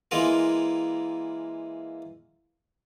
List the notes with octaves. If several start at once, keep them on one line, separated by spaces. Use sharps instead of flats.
E3 G#3 A#3 F4 A#4